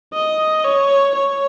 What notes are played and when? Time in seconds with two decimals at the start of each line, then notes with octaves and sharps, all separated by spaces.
0.13 D#5
0.64 C#5
1.15 C#5